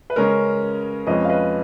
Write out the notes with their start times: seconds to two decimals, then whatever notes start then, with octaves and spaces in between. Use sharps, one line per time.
0.10 B4
0.16 C#3 G#3 C#4 A#4
1.07 F2 F3 G#3 C#4 B4 D#5
1.25 F5
1.29 B4 D#5